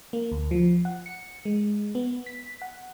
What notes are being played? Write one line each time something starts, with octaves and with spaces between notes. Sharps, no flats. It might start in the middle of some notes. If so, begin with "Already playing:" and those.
A#3
D2
F3
F#5
C#7
G#3
B3
B6
F#5